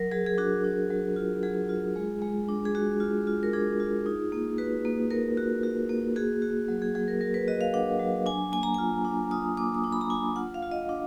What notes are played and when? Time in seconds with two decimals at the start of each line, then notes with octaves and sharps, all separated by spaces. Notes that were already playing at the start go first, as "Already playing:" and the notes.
Already playing: F#3 A#4
0.11 F#3 G#4
0.26 G#4
0.38 D4 F#4
0.64 D4
0.90 F#3
1.16 F4
1.43 F#3 G#4
1.69 F4
1.96 G#3
2.22 G#3
2.49 D4
2.65 G#4
2.75 G#3 F#4
3.00 F4
3.27 F4
3.43 A#4
3.53 D4 G#4
3.80 F4
4.06 D#4
4.32 A#3
4.58 F#4 B4
4.85 A#3
5.10 A#3 A#4
5.37 F#4
5.63 F#4
5.89 A#3
6.16 F#4 G#4
6.42 F#4
6.68 F#3
6.82 G#4
6.95 F#3 G#4
7.08 A#4
7.21 F#3 A#4
7.34 B4
7.48 F#4 D#5
7.61 F5
7.74 D4 F#5
7.99 F#3
8.26 D4 G#5
8.53 A#3 G#5
8.63 A#5
8.74 F4 G#5
9.05 D4
9.31 F4 D#6
9.57 A#3 D6
9.74 D#6
9.84 D4 D6
9.92 B5
10.01 A#5
10.10 D4 G#5
10.36 F4 F#5
10.54 F5
10.63 F4
10.71 D#5
10.89 D4